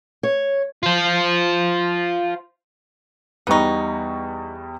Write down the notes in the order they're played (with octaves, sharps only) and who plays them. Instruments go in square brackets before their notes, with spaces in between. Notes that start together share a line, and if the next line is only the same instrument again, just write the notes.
[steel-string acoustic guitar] C#5
[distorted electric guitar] F4 C5
[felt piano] E2 G3 C#6 [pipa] B3 D#4